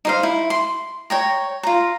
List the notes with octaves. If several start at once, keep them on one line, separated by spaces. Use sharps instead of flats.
D#4 C5 F5
E4
C6
C#5 G5 A#5
F4 A#5